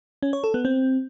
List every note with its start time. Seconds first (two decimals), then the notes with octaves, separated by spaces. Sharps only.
0.23 C#4
0.33 C#5
0.44 A4
0.54 B3
0.65 C4